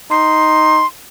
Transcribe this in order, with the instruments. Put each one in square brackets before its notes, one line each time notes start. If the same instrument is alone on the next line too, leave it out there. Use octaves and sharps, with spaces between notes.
[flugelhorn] D#4 [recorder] C6